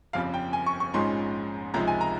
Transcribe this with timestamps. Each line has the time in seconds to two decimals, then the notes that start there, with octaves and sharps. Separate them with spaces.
0.13 G1 F2 C#3 G3 C4 F5
0.34 G5
0.53 G#5
0.66 C#6
0.80 C#6
0.94 A#1 G#2 F3 G#3 C#4 C6
1.74 C#2 C3 F3 G#3 D#4 A#5
1.87 G#5
2.01 A#5